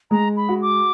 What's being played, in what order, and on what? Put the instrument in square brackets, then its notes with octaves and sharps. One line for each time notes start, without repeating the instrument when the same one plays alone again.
[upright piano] G#3 [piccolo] A#5
[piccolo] B5
[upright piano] F#4
[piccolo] D6